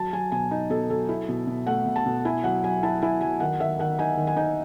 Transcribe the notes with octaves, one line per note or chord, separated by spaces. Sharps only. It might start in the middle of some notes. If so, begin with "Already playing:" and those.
Already playing: F#3 A5
F#3 G#5
B2 G#5
D#4
B2 A4
F#3 A4
E4
B2
B2
A3 F#5
B2
A5
B2
E4 G#5
F#3 F#5
F#3 G#5
E4 A5
E4 G#5
F#3 G#5
D#3 F#5
D#3 E5
D#3 F#5
D#4 G#5
D#3
G#5
D#4